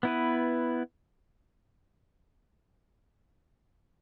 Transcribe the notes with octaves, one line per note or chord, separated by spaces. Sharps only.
B3 E4 B4